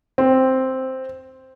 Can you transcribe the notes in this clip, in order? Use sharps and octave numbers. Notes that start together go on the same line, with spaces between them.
C4